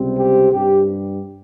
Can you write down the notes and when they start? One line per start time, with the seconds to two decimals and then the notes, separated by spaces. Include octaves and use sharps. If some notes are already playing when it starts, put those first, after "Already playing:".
Already playing: C#2 C3 G3 C4
0.19 G4
0.52 G2 G4